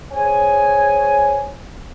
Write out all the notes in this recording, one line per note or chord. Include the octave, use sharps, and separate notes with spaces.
G#4 C5 C#5 G#5